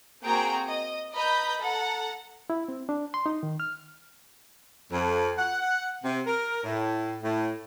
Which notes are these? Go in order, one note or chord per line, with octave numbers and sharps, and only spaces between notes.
A#3 C4 F#4 G#4 G5 A#5
D#5
B4 D#5 A#5 B5 G6
A4 F#5 A#5
E4
C4
D4
C6
D#4
D#3
F6
F2
F#5
C3
A#4
A2
A2